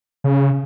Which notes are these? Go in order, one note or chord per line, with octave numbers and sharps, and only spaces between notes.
C#3